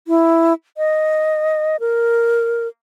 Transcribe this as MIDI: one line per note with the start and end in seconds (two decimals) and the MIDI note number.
0.08 0.53 64
0.78 1.77 75
1.80 2.68 70